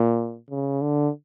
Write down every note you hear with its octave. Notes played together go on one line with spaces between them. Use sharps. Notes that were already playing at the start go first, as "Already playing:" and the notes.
Already playing: A#2
C#3
D3